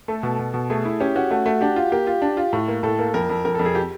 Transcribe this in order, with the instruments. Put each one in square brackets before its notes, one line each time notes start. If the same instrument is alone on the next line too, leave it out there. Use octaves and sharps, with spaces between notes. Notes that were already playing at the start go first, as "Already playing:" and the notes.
[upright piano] A3 [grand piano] A4
[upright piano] B2
B2
B2
[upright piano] A3 [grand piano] G#4
[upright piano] E4
[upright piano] C#4 [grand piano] G4
[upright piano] C#4 [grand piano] F#4
[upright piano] A3 [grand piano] F#4
[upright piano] A3
[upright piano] D4 [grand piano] G4
[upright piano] F4
[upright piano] A#3 [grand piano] G4
[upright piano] F4
D4
F4
A2
A#3
[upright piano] A2 [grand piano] A4
[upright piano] A#3
[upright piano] F2 [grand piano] A#4
[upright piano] F2
[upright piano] F2 [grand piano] A#4
[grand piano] A4
[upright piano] F2
[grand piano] G#4
G4